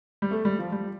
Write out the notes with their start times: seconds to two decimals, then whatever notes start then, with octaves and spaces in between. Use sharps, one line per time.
0.22 G3
0.31 A3
0.45 G3
0.59 F3
0.72 G3